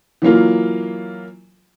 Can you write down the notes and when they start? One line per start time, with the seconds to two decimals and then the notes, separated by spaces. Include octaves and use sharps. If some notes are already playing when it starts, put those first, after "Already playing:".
0.22 E3 F#3 A#3 F4